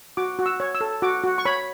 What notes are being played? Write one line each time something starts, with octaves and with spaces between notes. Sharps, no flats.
F#4 D6
F#4
E6
C#5
E6
A4
F#4 D6
F#4
C#6
C#5 B5